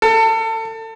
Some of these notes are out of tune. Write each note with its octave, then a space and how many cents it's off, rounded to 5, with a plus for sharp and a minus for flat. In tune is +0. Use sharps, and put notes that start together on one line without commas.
A4 +30